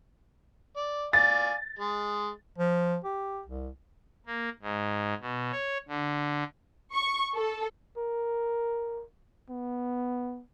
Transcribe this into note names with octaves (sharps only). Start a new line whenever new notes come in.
D5
D5 F5 G#5 A6
G#3
F3
G4
C2
A#3
G#2
B2
C#5
D3
C#6
A4
A#4
B3